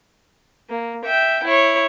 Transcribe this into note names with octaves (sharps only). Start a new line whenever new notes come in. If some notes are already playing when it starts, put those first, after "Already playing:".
A#3
E5 G5
E4 C#5